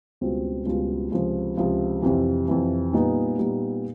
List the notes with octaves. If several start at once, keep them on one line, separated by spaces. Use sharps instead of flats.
C#2 B2 G3 C4 F4
C#2 B2 G3 C4 F4
C#2 C3 F3
C#2 C3 F3
F2 C3 E3
F2 C3 E3
A#2 G3 B3 D#4
A#2 G3 B3 D#4